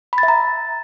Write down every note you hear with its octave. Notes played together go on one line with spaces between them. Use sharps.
B5
A6
E5
A#5